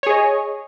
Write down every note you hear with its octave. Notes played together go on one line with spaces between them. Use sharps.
G#4 C#5 D#5